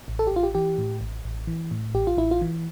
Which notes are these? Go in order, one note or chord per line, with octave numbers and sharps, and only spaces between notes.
A1
A4
G4
A1
F4
G4
E3 G4
A2
A1
A1
E3
A2
A1 G4
F4
A1 E4
F4
E3